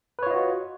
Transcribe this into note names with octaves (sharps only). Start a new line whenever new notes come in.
F4 F#4 B4 C#5 D#5